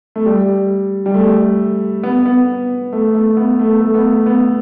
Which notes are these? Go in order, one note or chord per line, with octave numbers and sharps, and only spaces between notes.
A3
G3
G3
A3
B3
B3
A3
A3
B3
A3
A3
B3
A3
B3